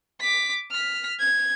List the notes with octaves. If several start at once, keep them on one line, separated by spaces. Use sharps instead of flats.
D6 B6
F6 B6
G#6